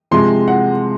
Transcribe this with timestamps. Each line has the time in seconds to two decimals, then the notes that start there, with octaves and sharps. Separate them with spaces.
0.11 C3 F3 G#3 C6
0.48 F#5